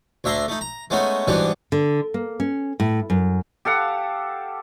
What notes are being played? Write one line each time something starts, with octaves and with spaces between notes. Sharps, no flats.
D2 D4 E5 A#5 C6
A3 D#4
A#5
G#3 A3 B3 C#4 D#4
G#2 B2 E3 G3 B3 D4
D3
A#3
C#4
A2
F#2
G4 A4 F5 F#5